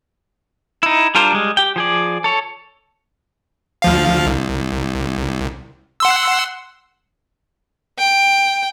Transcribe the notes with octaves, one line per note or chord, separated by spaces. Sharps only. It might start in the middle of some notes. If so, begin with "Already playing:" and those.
D#4 E4
G3 D4 F4 A#4 C5
G3 G#3
G4 G5
F3 G#4 D5
A4 C#5
D2 F3 F5
C2
F#5 C6 E6
G5